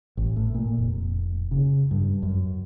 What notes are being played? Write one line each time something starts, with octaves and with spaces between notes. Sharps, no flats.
A1
A2
A#2
F1
C#3
G2
F#2